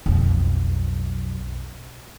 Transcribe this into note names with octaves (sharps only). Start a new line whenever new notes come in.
B1 F2